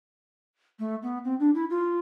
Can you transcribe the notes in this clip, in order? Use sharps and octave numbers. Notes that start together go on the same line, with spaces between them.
A3
B3
C4
D4
E4
F4